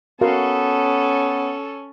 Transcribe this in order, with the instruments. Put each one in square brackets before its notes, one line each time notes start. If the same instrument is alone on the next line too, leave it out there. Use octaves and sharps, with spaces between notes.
[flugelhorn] B3 [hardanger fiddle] C#4 [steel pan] F#4 A#4 F5 [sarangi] A4